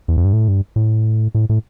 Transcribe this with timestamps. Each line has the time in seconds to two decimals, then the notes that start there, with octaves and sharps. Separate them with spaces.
0.08 E2
0.17 F2
0.25 G2
0.33 A2
0.48 G2
0.76 A2
1.34 A2
1.49 A2